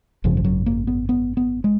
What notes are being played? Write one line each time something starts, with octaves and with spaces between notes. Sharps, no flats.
G#1 F#2 C#3 F3
F3
F#3
A#3
B3
B3
B3
G#3